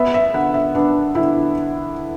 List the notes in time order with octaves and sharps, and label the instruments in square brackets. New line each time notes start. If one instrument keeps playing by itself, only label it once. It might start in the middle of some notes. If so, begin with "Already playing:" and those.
Already playing: [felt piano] B3 E5
E5
D3 F#5
E5
B3 D4
D3 E4